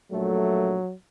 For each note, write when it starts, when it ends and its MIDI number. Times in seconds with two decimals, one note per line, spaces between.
0.12 0.76 34
0.12 0.93 54
0.12 0.76 57